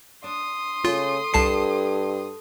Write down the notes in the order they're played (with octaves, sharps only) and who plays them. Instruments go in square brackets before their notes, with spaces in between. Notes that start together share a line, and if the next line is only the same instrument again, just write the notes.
[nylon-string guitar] D4 [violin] C6 D#6
[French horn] C#3 [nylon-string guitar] A3 [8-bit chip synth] F4
[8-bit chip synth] C2 A5 C7 [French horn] G2 [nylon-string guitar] A4